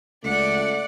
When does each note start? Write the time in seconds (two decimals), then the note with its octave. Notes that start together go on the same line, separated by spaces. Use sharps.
0.24 C#2 A3 D5 F#5